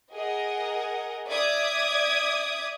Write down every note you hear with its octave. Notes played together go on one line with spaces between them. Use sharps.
G#4 A#4 D#5 F#5
D5 E5 D6 D#6 G#6